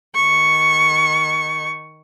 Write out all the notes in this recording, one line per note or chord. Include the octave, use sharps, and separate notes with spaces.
D#3 C#6